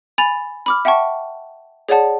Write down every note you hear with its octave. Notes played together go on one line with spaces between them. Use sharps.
G#5 B5 A6 F7
B5 D6 F6
E5 F#5 G5 A5 C#6
G#4 C#5 D5 F#5 A5